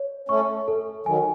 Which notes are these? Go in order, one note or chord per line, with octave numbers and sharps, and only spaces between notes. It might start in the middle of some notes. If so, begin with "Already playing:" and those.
Already playing: C#5
A3 C#4 C#6
A4
D#3 F#3 G#5